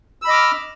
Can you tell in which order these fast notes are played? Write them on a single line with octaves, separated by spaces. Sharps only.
E6 B5 D#5 D6 F6